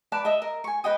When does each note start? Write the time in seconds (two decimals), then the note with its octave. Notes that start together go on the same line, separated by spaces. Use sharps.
0.12 B4 D5 A5 D6
0.25 D#5 E5
0.42 A#4
0.64 G#5 C#6
0.84 B4 D#5 G5 D#6